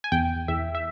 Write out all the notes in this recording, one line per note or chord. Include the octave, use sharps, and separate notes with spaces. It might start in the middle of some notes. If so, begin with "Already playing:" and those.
G#5
E2 G5
E2 E5
E5